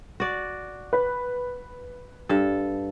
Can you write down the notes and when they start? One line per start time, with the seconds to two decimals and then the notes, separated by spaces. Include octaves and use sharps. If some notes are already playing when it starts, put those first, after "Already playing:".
0.20 F#4 D5
0.93 B4
2.29 G2 A4